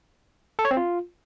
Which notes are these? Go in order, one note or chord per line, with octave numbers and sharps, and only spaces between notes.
A4
C#5
C4
F4